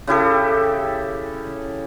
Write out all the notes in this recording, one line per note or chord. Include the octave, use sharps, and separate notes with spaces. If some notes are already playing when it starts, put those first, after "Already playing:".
C#3 E4 G4 A4